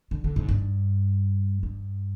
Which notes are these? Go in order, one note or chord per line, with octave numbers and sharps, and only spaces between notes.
D3
D3
G#2
G2
G2